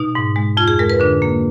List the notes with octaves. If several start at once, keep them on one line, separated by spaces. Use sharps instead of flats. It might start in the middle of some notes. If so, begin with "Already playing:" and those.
Already playing: B2 D#4
G#2
G#3
F2 F4
G#4
G#3 A#4
B4
D3 D4
A#3